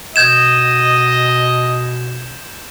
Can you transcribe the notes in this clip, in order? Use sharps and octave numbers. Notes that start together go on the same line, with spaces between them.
B2 D#5 G6 G#6 E7